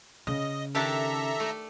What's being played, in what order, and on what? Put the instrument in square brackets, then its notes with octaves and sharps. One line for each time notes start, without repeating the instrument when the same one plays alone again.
[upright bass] C#3 [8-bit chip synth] D#5
[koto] D#3 D4 G4 [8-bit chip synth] A4 E5 A#5
[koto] A3